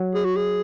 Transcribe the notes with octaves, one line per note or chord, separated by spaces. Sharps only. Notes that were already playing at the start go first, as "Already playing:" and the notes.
Already playing: F#3
G#4
F#4
G#4